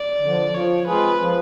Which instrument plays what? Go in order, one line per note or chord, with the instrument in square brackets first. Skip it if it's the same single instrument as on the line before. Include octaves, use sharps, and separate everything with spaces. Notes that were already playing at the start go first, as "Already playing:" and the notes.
Already playing: [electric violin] D5
[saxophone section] D3 F3
[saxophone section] F3 [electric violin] C#5
[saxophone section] G#3 C4 F4 G#4 [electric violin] B4
[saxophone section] F3